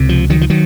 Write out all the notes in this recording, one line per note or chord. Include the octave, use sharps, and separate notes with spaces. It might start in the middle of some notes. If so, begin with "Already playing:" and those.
Already playing: C#2 C3
F3
D#3 F#3
F3
D#3 F#3